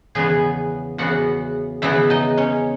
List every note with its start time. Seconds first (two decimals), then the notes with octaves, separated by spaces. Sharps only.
0.15 E2 C#3 E3 B3 G#4 G#5
0.98 E2 C#3 E3 B3 F#4 F#5
1.82 E2 C#3 E3 B3 E4 E5
2.10 D#4 D#5
2.37 C#4 C#5